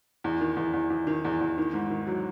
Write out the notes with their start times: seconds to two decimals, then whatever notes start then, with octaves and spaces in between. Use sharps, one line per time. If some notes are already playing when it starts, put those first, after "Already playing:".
0.24 E2
0.41 D#3
0.57 E2
0.73 E2
0.90 E2
1.07 D#3
1.25 E2
1.41 E2
1.58 D#3
1.74 G#2
1.91 D#3
2.07 F#3